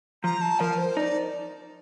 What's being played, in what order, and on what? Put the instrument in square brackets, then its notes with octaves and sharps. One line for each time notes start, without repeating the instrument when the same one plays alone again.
[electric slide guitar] F3 [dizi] A#5
[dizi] A5
[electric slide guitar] F3 [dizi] A#4
[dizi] C5
[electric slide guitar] D#4 [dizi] D5